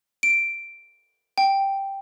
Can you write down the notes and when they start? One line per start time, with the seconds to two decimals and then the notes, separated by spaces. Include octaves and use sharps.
0.23 D7
1.38 G5